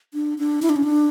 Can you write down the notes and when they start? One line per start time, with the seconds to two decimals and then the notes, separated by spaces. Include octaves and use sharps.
0.14 D4
0.39 D4
0.62 E4
0.69 D4
0.76 C#4
0.83 D4